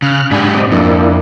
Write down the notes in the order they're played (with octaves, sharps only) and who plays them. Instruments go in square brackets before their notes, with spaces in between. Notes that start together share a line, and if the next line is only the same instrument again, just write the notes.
[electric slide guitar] C#3 [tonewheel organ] F6 F#6
[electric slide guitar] G#2 G4 [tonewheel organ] D4 G#5 B5
[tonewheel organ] C4 D5 D#5
[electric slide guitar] F2 [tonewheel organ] A#3 D4 E4